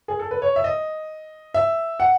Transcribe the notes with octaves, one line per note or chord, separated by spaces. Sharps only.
G#4
A4
B4
C#5
E5
D#5
E5
F#5